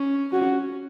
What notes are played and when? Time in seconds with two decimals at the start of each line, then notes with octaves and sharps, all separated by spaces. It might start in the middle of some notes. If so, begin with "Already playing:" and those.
Already playing: C#4
0.33 C#4 F#4